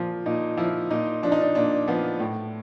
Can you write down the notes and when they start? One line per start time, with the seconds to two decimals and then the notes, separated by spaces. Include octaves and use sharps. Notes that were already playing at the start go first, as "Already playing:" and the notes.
Already playing: A#2 F3
0.26 A#2 D#4
0.58 F3 E4
0.90 A#2 D#4
1.23 F3 D4
1.32 D#4
1.41 D4
1.55 A#2 D4
1.88 F3 B3
2.20 A2